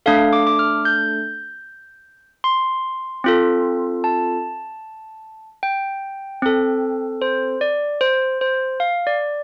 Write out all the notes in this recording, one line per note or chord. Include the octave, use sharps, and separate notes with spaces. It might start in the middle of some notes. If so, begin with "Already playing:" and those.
A3 D4 A4 F5
D6
D6
F6
G6
C6
C4 F4 A4
A5
G5
C4 A4
C5
D5
C5
C5
F5
D5